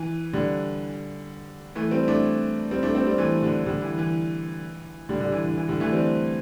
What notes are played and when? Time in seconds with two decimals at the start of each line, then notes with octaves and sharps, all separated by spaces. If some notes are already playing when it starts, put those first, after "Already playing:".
Already playing: E3
0.33 D3 G3
1.75 E3 A3
1.91 G3 C4
2.08 A3 D4
2.71 G3 C4
2.83 A3 D4
2.95 G3 C4
3.06 G3 C4
3.18 E3 A3
3.43 D3 G3
3.66 D3 G3
3.82 E3
3.98 E3
5.09 D3 G3
5.20 D3 G3
5.32 E3
5.45 D3
5.57 E3
5.68 D3 G3
5.80 E3 A3
5.92 G3 C4